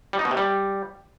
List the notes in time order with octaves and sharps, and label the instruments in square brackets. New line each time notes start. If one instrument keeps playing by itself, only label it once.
[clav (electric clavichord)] G3
D#4
B2
C3
G3